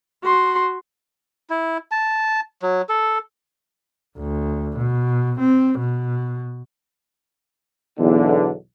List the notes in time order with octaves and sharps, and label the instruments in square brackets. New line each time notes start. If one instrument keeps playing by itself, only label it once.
[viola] F#4 C6
[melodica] E4
A5
F#3
A4
[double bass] D2
B2
C4
B2
[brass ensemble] B1 E2 D3